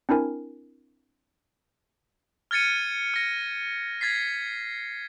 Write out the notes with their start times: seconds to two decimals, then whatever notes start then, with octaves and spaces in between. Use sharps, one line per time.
0.09 C4 D4 E4 A#4 G#5
2.51 F6 G#6 A6 C#7 D#7
3.14 F6 A#6
4.01 G#6 A6 B6 C7